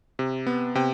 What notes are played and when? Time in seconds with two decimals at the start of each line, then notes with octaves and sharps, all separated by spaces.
0.19 C3
0.46 B3
0.75 C3 G5